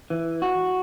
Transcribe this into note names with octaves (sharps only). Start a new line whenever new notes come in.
E3
F#4